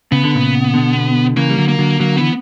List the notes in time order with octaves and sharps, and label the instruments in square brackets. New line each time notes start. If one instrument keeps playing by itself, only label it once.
[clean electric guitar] C#3 [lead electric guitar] B3
[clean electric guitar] D3
A#2 C#3
B2 D3
[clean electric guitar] C#3 E3 [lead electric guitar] A#3
[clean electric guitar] G3
D3 F#3
[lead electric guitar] A#3
[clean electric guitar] D3 F#3
[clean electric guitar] D3 F#3 [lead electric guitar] A#3
[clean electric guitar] E3 [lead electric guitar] B3